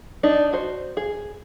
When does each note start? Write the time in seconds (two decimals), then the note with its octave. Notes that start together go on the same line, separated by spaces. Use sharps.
0.23 D4 D#4
0.53 F#4 C5
0.97 G#4